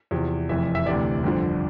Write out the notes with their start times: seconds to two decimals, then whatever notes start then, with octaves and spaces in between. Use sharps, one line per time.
0.11 E2 C3 F3
0.49 F1 F2 E3 E5
0.75 E5
0.85 D2 C3 E3 D5
1.24 G1 F2 D3 F3